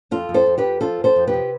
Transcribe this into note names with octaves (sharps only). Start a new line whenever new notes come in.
F2 F4 A4
F2
A4 C5
F2
G4 B4
F2
F3 F4 A4
F2
A4 C5
F2
G4 B4
C3